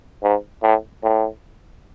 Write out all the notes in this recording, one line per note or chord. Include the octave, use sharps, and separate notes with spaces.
G#2
A2
A2